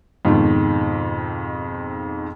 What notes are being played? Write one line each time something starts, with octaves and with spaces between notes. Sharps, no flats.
F2 G#2 B2 D#3